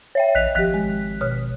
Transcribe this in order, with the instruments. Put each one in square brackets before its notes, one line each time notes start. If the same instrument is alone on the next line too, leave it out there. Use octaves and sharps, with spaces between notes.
[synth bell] C#5 E5 G5
[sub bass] A#1 [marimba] D#5 [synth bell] F#6 B6 F7
[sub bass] G#1 [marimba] F3 G4 [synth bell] F#6 B6
[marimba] G#3
B2 C#5 F6